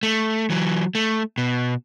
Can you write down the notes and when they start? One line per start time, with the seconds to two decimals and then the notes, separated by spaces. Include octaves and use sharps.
0.03 A3
0.50 E3 F#3
0.95 A3
1.38 B2